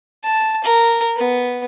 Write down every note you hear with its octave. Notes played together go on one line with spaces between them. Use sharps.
A5
A#4
B3